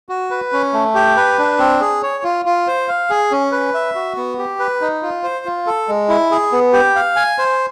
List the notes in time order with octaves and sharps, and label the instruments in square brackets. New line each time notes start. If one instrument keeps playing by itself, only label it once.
[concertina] F#4
B4
C#4
A3
G4
B4
D4
C4
G#4
C#5
F4
F4
C5
F5
G#4
C#4
B4
E5
F#4
B3
G4
B4
D#4
F4
C5
F4
A4
G#3
E4
G#4
B3
G4
F5
G#5
C5